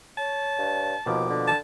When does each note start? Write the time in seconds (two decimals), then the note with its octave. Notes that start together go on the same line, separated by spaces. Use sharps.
0.18 C#5 A5
0.58 G2
1.06 D#2 B2 F3 A#3 D6
1.29 D3
1.48 A5